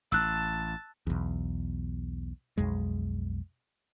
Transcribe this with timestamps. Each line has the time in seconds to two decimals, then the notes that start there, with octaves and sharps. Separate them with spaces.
0.12 A1 A5 E6 F#6
1.07 B1 E2
2.57 B1 F2 G#3